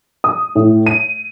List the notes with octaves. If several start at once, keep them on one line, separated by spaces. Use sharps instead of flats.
D#6
A2
D#7